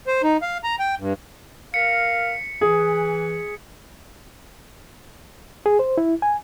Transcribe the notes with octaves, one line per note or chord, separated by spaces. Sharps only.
C5
D#4
F5
A#5
G5
G2
A#4 F5 B6 C#7
E3 G#4
G#4
C5
E4
G#5